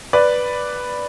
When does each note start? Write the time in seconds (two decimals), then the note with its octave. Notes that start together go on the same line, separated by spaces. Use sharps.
0.13 B4 D5